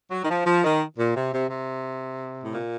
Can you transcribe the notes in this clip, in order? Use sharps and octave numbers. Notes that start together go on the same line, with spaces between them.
F#3
D#3
F3
F3
D#3
A#2
C3
C3
C3
A2
A#2